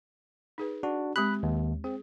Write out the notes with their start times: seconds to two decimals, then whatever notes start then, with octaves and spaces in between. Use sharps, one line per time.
0.58 D#4 G#4 B4
0.83 D4 F#4
1.16 G#3 C4 G4 B5 F#6
1.43 D#2
1.84 C4 G#4